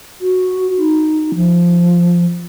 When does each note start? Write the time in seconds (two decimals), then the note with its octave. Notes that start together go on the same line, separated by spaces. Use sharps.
0.21 F#4
0.78 D#4
1.35 F3